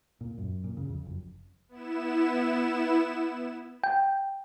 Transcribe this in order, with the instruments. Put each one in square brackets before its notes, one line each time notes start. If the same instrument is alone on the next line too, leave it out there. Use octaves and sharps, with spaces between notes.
[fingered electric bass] A#2
F#2
A#2
C#3
F2
F#1
[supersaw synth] B3 E4 E7
[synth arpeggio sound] G5